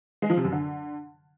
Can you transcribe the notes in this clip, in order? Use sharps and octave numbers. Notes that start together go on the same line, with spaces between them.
G#3
F3
C3
F#2
D3